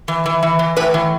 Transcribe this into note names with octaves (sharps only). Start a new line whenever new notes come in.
E3
E3
E3
E3
A2 B4
E3